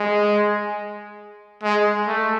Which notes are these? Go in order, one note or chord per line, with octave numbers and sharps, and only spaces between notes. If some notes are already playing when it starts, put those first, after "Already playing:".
Already playing: G#3
G#3
A3